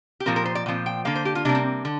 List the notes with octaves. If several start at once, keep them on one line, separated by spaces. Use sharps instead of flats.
G4
A#2 F3 C4 A#4
A#4
C5
D5
A#2 F3 C4
G5
D3 A#3 F5
C5
G4
F4
C3 G3 A#3 D4
C4
D3